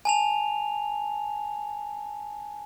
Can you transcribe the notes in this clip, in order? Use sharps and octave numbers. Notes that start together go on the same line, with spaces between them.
G#5 A5 F7